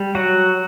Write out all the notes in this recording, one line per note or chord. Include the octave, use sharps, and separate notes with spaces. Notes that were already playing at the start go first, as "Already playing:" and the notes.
Already playing: G3
F#3 F#4